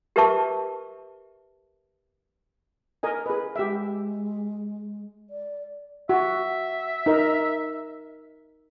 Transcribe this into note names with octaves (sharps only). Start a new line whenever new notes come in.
G4 A#4 B4 E5 A5 C#6
A#4 D#5 G#5
G#4 B4
G#3 G4 E5
D5
F#4 E5
D#4 A#4